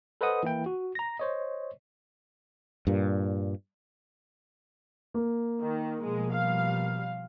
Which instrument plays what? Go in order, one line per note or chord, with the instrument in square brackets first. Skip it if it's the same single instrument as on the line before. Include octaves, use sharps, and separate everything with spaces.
[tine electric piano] A4 B4 C5 D#5 F#5 D#6
E3 A#3 E4 G5
F#4
A#5 A#6
C5 C#5 D#5
[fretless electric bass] G2 A#2
[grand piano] A#3
[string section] D#3
[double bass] B2 F3 [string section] G#3
[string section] G3 F5